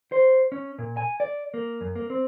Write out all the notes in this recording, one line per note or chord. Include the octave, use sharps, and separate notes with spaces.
C5
C#4
A#2
G#5
D5
A#3
F#2
A#3
C4